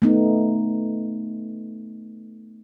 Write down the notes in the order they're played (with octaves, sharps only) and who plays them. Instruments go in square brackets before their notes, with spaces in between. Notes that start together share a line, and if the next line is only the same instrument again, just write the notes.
[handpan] A3 B3 D#4